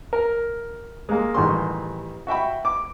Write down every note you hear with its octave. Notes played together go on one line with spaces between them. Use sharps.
A#4
G#3 A#3
A1 D#3 G3 F#4 G#4 C6
F#4 E5 G5 B5
D6